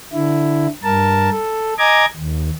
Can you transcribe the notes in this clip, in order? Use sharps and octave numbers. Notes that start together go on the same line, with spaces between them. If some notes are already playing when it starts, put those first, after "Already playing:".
D3 E4
G2 A#4 A5
A4
D#5 G#5 A#5 D6 G#6
D#2